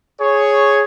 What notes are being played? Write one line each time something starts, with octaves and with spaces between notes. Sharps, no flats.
G#4 C#5